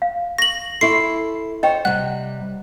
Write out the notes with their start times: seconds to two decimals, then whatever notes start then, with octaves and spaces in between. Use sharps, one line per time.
0.02 F5
0.38 C#6 A#6 F#7
0.81 E4 A4 C6 C#6 C7
1.63 C5 C#5 D#5 G5
1.85 C3 G3 F#5 F#6